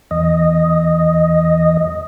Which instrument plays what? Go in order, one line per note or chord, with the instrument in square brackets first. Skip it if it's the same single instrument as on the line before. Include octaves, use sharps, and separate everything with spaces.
[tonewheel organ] E2 D#5